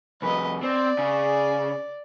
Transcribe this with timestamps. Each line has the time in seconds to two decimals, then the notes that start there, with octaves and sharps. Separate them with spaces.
0.22 C2 F2 B4 D#5
0.63 C4 D5
0.99 C#3